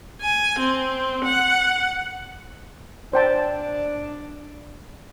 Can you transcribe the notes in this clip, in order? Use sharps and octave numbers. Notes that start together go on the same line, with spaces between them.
G#5
C4
F#5
D4 C5 G5 A5